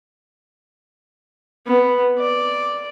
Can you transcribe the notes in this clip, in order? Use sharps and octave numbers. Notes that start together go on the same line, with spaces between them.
B3
D5